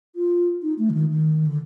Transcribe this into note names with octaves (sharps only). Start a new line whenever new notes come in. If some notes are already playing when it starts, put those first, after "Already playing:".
F4
D#4
A3
D3
D#3
D#3
D3